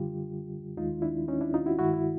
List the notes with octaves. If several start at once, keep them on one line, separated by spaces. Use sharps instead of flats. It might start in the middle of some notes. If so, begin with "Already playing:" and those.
Already playing: F#2 D3 G3 F4 G4
D#2 D#3 G#3 D#4 F4
D4 E4
C#4 D#4
D4 E4
D#4 F4
E4 F#4
G2 D#3 G#3 E4 F#4
E4